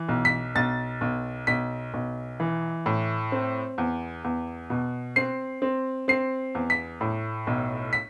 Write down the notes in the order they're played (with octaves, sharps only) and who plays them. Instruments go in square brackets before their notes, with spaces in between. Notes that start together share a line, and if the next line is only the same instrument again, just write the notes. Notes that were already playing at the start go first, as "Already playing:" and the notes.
Already playing: [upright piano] E3
B1
B6
B1 A6
B1
B1 B6
B1
E3
A2
C4
E2
E2
B2
C4 C7
C4
C4 C7
E2
B6
A2
B1
B6